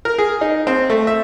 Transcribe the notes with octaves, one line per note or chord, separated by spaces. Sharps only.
A#4
G#4
D#4
C4
A3
E5